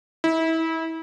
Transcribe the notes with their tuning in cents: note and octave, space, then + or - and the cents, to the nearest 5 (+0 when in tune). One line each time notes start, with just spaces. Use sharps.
E4 -30